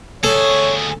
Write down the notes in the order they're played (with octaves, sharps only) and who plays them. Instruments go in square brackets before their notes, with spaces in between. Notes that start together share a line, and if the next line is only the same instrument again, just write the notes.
[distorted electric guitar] D2 G#4 [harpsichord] A4 [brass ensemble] C#5